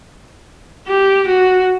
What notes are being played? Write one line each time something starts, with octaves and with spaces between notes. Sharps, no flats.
G4
F#4